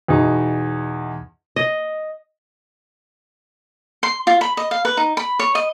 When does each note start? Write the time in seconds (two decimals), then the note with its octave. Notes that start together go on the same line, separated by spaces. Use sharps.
0.08 E2 B2 D#4
1.56 D#5
4.03 C6
4.27 F4
4.41 B5
4.57 D#5
4.71 F5
4.85 B4
4.97 D#4
5.17 B5
5.39 C#5
5.55 D#5